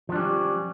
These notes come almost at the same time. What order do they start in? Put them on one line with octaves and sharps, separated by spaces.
F3 D4 G3 C#4